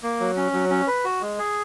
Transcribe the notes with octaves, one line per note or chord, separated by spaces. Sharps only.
A#3
F#3
C#4
F#3
C#4
B4
F#4
G#3
G#4